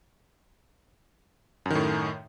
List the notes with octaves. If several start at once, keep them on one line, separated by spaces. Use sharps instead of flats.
F#2 A2 D#3